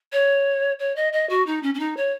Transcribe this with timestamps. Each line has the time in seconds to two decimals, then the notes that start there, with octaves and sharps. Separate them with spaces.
0.12 C#5
0.79 C#5
0.96 D#5
1.13 D#5
1.29 F#4
1.46 D#4
1.63 C#4
1.74 C#4
1.79 D#4
1.97 C#5